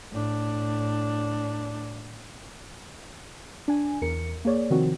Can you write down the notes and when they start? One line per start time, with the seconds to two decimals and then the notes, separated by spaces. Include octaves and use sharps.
0.12 A2 D4
3.68 D4 G#5
4.02 E2 A#4 C#7
4.45 A#3 G#4 C#5 D5
4.70 C3 D#3 F3 C4 F#4